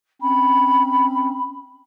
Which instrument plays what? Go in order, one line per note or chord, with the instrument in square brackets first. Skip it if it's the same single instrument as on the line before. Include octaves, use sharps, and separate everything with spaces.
[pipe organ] C4 C#4 [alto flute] B5